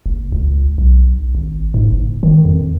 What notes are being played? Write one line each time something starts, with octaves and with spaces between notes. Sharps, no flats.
F#1
C#2
B1
G#1
G#2
F#1
D#3
F2